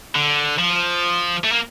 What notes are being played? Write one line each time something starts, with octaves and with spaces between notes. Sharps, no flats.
D3
F3
A3
A#3